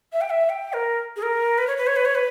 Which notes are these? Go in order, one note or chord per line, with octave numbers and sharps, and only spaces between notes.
E5
G5
E5
G5
A#4
G#4
A#4
B4
C#5
B4
C#5
B4
C#5
B4